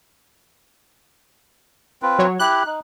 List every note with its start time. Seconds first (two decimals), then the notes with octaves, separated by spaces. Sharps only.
2.02 C4 F4 B4
2.19 F#3 C#5
2.39 E4 G4 F#6
2.66 D#4